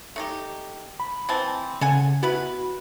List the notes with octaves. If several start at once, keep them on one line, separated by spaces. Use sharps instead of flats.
A3 D#4 G4
B5
E3 C4 A5
C#3 A4 F#5 G#5
B3 E4 F#4 B4